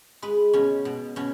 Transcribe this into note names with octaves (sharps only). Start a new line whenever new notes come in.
G#3 B4
B2 C#4
B2
B2 C#4